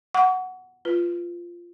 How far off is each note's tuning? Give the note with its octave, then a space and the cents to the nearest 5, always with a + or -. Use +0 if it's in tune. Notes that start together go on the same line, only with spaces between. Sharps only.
F#5 +0 C#6 +40
F4 -10 B4 +0